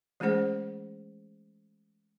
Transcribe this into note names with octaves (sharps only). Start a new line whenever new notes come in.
E3 G#3 A3 C#4 G#4 C5